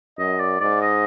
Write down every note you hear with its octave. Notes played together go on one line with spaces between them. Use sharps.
F#2 D#5
D5
G#2 D5
D#5